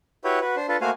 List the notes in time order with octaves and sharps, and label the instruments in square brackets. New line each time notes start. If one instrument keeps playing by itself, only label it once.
[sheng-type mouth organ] E4 F#4 G4 B4 C#5
F#4 B4
D4 C5
D4 F4 A4 B4
A3 A#3 F#4 C5 F5 G#5